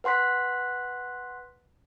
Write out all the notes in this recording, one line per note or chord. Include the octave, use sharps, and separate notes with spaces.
B4 F#5 C6 F#6 B6